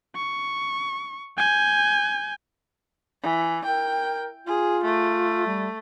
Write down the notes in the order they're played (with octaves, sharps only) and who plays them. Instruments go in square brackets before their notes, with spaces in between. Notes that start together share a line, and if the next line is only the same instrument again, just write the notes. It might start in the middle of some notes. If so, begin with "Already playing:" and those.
[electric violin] C#6
G#5 G6
[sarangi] E3
[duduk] A#4 [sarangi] G5
[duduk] F4 [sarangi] G#4
[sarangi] A3
[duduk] G3